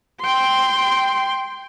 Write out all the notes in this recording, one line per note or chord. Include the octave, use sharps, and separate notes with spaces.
G5 C6